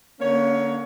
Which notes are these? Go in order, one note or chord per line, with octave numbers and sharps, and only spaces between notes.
D3 A#3 C#4 C#5